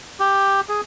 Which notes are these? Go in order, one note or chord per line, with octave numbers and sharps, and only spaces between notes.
G4
G#4